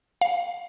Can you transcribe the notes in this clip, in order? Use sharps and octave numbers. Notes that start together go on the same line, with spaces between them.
F5